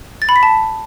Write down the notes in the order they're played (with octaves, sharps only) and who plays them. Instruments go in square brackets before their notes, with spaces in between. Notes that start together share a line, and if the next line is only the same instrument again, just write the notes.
[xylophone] A6
B5
B6
A5